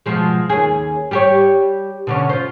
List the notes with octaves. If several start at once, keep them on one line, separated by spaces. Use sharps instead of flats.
B2 F3 G#3
D#2 C#4 G#4
G3 G4 C#5
B2 D3 C#4
F4 C5